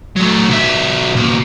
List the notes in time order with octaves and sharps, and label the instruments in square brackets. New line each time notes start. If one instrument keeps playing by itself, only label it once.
[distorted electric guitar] F#3 A3
B1 E5
B2 A#3